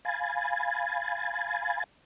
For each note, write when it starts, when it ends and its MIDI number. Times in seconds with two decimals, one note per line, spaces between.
0.05 1.84 77
0.05 1.84 80
0.05 1.84 83
0.05 1.84 92
0.05 1.84 93